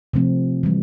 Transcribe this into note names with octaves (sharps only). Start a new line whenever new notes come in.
C3 F3 A3 C4
E3 G3